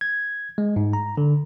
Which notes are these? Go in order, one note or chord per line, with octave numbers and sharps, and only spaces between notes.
G#6
G#3
G#2
A#5
D3